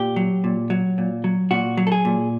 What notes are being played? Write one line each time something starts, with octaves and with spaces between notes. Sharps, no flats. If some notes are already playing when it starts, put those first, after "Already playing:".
Already playing: A#2 G4
F#3
A#2
F#3
A#2
F#3
A#2 F#4
F#3
A4
G#4
A#2